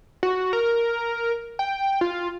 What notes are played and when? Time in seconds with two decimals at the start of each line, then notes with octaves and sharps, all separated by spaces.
0.23 F#4
0.53 A#4
1.59 G5
2.01 F4